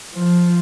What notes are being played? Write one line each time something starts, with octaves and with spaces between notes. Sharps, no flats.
F3